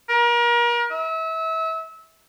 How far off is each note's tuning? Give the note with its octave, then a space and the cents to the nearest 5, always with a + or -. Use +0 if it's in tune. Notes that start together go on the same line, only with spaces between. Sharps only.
A#4 +35
E5 -30